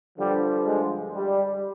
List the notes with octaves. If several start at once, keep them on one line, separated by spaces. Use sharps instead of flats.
G2 D3 F3 G3
G#3
G3